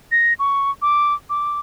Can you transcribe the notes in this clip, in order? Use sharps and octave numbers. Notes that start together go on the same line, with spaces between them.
A#6
C#6
D6
D6